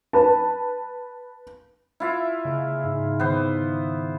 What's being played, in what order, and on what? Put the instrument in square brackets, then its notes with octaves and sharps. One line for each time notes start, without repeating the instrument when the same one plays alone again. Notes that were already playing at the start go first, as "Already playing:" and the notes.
[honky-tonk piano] B4 A5
[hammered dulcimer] E4 F4 E5
[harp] C#3 G#3 A#3
G#2
[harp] D#3 D6 [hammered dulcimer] B3 C5